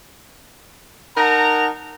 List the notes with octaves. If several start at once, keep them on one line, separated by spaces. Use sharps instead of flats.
D#4 A#4 F#5 A5 A#5